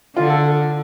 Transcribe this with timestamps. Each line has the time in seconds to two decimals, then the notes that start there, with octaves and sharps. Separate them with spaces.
0.16 D3 F4
0.30 A4